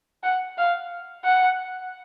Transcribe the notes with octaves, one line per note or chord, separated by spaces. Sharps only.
F#5
F5
F#5